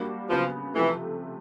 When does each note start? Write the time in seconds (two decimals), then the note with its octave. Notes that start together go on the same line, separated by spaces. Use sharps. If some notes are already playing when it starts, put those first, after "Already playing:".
Already playing: G3 A#3 D4 F#4
0.30 C#3 F3 F#3 B3
0.75 C3 E3 F3 A3